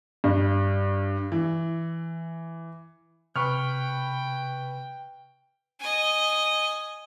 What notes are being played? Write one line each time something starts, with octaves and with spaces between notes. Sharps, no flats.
G2
E3
C3 B4 G5 C#6 F6
D#5 G#5